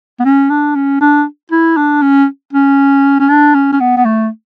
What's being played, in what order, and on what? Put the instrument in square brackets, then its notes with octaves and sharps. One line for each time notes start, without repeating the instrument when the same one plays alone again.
[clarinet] B3
C#4
D4
C#4
D4
E4
D4
C#4
C#4
C#4
D4
C#4
C#4
B3
B3
A3